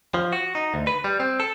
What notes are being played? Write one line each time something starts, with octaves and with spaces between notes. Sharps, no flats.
F3
F#4
D#4
D2
B4
G3
C4
A4